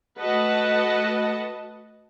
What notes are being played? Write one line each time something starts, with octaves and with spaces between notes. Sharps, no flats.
A3 F#4 B4 D#5 F#5 A5